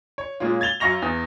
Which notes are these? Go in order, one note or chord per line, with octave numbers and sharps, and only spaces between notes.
C#5
A#2 G#3 A#3 C#4 F4
G#6 A6 F7 G7
F#2 F5 C#6 A#6 F7
E2